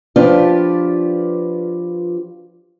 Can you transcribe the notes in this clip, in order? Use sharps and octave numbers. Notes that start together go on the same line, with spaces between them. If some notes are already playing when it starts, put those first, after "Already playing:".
F3 D4 F4 G4 B4 D5